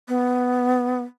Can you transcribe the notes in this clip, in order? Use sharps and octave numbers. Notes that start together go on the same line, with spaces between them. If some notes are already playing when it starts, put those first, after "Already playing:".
B3